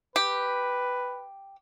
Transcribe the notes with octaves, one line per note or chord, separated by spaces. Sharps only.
G4 B4